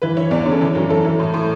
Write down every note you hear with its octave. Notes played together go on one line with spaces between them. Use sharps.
E3 B4
E3 C#5
E2 D5
C#3
A4
E3 C#5
F#2
E3 A4
E3
A2
A2